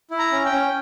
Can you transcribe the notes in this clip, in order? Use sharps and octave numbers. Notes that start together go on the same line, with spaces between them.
E4
A#5
C#4
G5
C#4